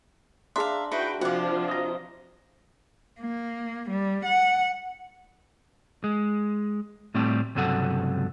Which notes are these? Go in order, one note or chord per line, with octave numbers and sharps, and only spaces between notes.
D4 G#4 E5 F5 A#5 C6
D#4 E4 F#4 B4 G5
C3 F3 D4 F4 F#4 D5 F#5
D#5 A#5
A#3
G3
F#5
G#3
A2 G3 A3 C4 G4
C#2 G2 C3 F#3 A4 F#5